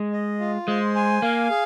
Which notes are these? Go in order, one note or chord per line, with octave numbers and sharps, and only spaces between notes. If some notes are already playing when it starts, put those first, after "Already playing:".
Already playing: G#3
D#5
F4
G#3 C5
G#5
A#3 F5
G#4